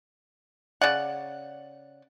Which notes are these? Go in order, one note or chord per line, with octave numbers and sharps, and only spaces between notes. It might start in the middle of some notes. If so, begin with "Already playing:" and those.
C#3 D5 F#5